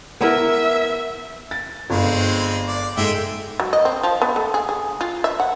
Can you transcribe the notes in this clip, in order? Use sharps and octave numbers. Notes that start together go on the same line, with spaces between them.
B3 E4 A#4 E5
A6
G1 G#3 C4
D5
G#2 G#3 A4 E5 G5
F#3
D#5
C4
F3
B3
A3
G#4
G#4
F4
E5
F#5